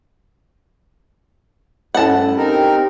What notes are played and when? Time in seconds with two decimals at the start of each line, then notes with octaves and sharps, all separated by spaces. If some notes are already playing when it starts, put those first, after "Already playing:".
1.94 G2 A3 C#4 E4 F#5 A5
2.37 C4 D#4 G4 A#4